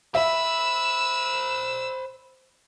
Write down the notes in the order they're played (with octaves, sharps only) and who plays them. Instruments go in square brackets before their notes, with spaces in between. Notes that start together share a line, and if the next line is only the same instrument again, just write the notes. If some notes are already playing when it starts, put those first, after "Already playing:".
[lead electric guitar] C5 B5 [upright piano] E5 [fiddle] E6